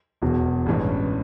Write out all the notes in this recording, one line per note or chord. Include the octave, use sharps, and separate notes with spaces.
E1 E2 B2 F#3
A1 G2 E3 G#3 C#4